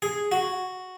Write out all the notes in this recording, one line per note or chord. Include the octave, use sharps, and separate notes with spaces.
G#4
F#4